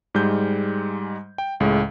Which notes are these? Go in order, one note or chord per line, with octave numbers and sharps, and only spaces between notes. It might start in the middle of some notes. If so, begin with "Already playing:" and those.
G#2 G3 G#3 G6
G5
C#2 A2 G#3